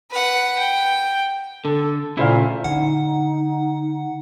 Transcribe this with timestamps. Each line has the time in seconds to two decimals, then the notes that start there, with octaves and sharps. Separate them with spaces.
0.11 B4 F#5
0.58 G5
1.65 D3 A4
2.17 A#2 C#3 A3 E4 C5 F5
2.64 D3 D#4 F#5